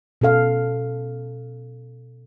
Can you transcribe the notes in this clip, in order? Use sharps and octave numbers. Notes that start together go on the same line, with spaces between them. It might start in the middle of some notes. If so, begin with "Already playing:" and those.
B2 C#4 A4 F5